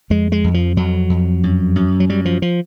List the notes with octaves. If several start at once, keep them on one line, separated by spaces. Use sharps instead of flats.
F2 G#3
G#3
F2
F3
F2 F#3
F2
F#2
F#2
F#3
F#2 G3
F3
F3